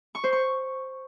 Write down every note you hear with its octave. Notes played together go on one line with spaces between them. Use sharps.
C#6
C5
C#6